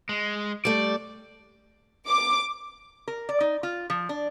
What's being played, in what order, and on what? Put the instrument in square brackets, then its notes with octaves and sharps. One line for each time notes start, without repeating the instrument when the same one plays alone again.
[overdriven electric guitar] G#3
[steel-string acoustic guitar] G3 A3 [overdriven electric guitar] D5
[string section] D6
[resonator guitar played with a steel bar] A#4
D5
D#4
F4
F3
D4